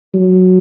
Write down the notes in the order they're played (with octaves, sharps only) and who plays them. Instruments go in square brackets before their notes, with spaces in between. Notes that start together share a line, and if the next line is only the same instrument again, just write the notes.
[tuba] F#3